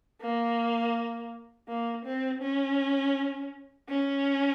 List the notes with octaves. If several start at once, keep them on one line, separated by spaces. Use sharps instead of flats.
A#3
A#3
C4
C#4
C#4